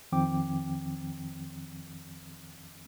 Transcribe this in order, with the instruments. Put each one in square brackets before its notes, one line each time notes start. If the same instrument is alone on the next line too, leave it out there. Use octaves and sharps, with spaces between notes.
[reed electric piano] F2 D#3 F3 C4 G5 D6